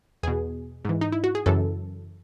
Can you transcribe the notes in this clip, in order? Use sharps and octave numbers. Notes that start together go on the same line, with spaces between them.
E2 B2 G#4
G#2 E3
D#4
E4
F#4
G#4
F#2 C#3 E3 A4